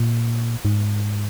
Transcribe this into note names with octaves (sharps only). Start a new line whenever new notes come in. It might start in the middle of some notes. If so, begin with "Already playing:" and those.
Already playing: A#2
G#2